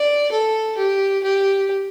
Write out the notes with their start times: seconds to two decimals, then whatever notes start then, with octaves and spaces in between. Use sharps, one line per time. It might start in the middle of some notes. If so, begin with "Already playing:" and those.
Already playing: D5
0.31 A4
0.77 G4
1.23 G4